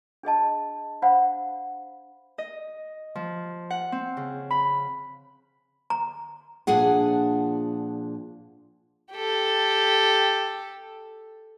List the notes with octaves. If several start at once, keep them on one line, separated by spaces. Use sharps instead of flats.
D4 G#4 D#5 A5
D4 C5 F5 F#5 B5
D#5
F3
F#5
C4
C#3
B5
A#5
A#2 F3 D4 G#4 F#5
G4 A4